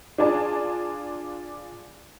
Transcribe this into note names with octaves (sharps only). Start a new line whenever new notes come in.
D4 F4 G#4 D5 A5